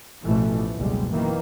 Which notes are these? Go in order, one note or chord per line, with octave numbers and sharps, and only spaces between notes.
A1 B2 E3 F3 A3
F#1 C#2 B2 G3 G#3
B2 D#3 E3 A#3